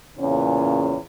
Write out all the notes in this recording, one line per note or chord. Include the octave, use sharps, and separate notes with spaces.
E2 A#2 C#3 C#4